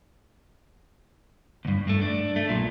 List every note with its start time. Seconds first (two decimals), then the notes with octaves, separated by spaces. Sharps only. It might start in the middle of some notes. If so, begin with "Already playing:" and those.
1.65 D2 G2
1.87 G2 A3
2.01 D4
2.36 A3
2.49 B1 A#2